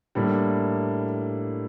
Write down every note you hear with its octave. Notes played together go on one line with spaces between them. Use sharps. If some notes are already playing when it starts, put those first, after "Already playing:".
A2 G3 A#3 D4